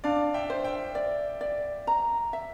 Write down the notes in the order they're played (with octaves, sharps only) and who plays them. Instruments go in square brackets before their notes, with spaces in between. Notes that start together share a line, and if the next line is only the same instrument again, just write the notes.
[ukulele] D4 [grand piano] D5 F5
[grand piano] E5 G5
[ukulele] C5
[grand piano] E5 G5
[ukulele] D5
D5
A#5
E5